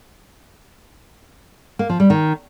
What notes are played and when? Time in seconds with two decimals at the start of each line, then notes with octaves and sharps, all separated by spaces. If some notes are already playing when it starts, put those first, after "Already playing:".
1.79 A#3
1.89 F3
2.00 G3
2.10 D#3